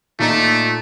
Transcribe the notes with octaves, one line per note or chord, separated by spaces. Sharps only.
A#2 A3 D#4